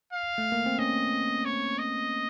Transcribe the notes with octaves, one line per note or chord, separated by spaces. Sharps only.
F5
A3
A#3
C4
C#4 D#5
C#5
D#5